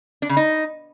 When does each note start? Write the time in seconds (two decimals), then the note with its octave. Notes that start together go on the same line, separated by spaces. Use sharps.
0.22 D4
0.29 C#3
0.37 D#4